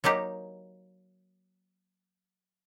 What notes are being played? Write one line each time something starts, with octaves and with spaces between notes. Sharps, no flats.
F#3 A#3 D#4 G4